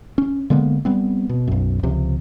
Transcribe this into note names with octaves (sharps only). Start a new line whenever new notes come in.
C#4
D3 G#3 A#3 B3
G3 B3 C4
B2
B1 F#2
C#2 C3 F3